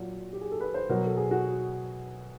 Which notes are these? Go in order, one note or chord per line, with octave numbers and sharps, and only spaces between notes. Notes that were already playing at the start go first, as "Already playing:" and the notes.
Already playing: A#2 F#3
G4
G#4
A4
B4
C5
B2 F#3 A#4
A4
G#4
F#4